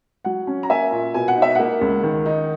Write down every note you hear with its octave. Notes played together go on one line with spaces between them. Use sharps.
F#3 F#5
C#4
A#5
A#3 E5 G#5
A#2
B2 G#5
F#5
D#4
E5
A#3 F#5
C#2
D#3
D#4